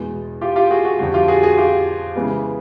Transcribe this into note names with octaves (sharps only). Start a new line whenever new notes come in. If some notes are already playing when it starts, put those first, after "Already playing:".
Already playing: E2 B2 G#3 B3
F4 G4
F4 G4
F#4 G#4
F#4
F2 D3 G3 F#4
F4 G4
F#4 G#4
F#4 G#4
F4 G4
C#3 E3 G#3 B3